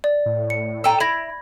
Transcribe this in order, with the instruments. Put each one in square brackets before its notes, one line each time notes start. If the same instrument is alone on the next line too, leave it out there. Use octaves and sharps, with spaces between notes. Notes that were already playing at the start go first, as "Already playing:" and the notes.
[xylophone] D5
[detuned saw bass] A2
[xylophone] C#7
[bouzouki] A4 G5 A#5
[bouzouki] E4 [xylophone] B5 G#6 A#6